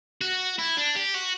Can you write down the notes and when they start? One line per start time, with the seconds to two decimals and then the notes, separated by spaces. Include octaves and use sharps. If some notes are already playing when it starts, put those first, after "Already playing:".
0.21 F#4
0.58 E4
0.77 D4
0.95 G4
1.14 F#4